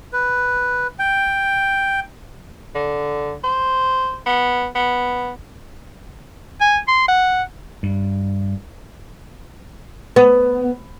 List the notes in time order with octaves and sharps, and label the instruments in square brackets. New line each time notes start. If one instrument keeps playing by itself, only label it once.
[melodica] B4
G5
[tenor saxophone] D3
C5
B3
B3
[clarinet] G#5
C6
F#5
[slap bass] G2
[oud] B3